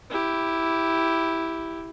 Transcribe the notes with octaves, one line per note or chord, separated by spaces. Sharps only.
E4 G4